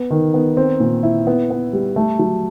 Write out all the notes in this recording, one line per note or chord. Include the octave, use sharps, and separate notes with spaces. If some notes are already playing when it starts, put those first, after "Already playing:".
Already playing: B3
D#3
B3
C4
A#2
E4
B3
B3
G3
A3
F#3